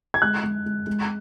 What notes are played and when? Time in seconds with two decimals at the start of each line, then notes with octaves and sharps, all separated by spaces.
0.14 G#6
0.22 G#3 F#6
0.43 G#3
0.66 G#3
0.87 G#3